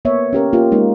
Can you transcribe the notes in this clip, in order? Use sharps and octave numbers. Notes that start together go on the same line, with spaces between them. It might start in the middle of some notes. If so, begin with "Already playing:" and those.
A#3 B3 C#5 E5
C#4 G4 A#4
A#3 F4 G4
G#3 A#3 D#4